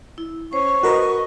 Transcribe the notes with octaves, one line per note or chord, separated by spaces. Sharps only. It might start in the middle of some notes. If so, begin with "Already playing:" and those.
E4
C#4 C5 C#6
F#4 A#4 B4 D#5